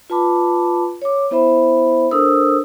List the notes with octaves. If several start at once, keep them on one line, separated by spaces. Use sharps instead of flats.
F4 B4 A5 B5 D6
C#5 D6
B3 E4 C5 E5 B5
D4 A4 A#4 C5 D#6 E6